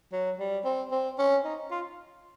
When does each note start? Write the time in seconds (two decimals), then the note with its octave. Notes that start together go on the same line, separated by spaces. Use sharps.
0.13 F#3
0.40 G3
0.65 C4
0.92 C4
1.18 C#4
1.45 D#4
1.71 F4